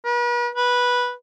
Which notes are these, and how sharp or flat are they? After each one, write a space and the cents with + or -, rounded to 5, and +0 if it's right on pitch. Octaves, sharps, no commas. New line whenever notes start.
B4 -40
B4 -10